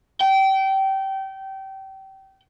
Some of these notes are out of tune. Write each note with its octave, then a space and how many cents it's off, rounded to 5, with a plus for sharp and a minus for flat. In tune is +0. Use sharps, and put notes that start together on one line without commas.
G5 -25